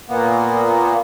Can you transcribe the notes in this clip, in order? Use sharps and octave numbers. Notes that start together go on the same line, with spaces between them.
A#2 A#3 B3